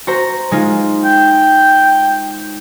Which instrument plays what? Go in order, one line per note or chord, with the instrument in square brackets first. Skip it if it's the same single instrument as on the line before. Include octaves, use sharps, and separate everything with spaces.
[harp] F#4 C5 A#5
G#3 D#4 F4
[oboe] G5